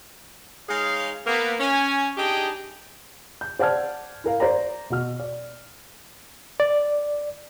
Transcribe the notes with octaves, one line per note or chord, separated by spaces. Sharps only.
G#3 D#4 G#4 C#5 F5
A#3 B3
C#4 G#5
D4 D#4 G4 G#4 D#5 G5
G6
C5 D5 F#5 A5 F6 G#6
E4 A#4 F5
C5 D5 A#5
B2 F#4 F6
D5
D5